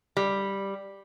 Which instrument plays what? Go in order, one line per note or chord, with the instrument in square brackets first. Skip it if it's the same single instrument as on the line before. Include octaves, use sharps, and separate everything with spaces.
[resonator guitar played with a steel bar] G3